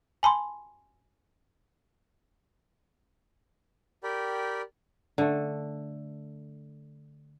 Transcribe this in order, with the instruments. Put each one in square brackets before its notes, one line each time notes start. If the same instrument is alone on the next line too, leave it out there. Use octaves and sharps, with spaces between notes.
[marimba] G#5 A5 B5 C6
[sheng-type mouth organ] G4 A#4 D5 G5 B5
[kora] D3 A3